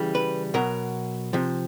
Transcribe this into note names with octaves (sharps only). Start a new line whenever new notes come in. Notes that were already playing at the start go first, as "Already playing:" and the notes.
Already playing: C#3 E3 G3
B4
B2 F#3 A#4
C3 F3